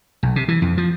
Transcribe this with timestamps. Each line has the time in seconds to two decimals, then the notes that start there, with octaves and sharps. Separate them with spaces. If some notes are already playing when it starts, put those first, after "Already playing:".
0.23 B1
0.36 C3
0.48 E3
0.62 F2
0.78 F3